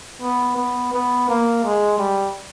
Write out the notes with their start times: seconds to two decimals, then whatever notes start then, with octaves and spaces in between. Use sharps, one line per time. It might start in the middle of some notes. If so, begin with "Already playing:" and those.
0.22 B3
0.57 B3
0.93 B3
1.29 A#3
1.64 G#3
1.99 G3